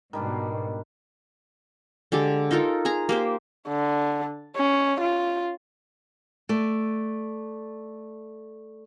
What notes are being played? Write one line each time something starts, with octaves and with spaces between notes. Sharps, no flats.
G#2 B2 D#3 G3 D4
D3 G#3 G4 A4
D#4 F4 A4 A#4
G#4 G#5 A#5
A#3 G4 C5
D3
C#4
F4
A3 D5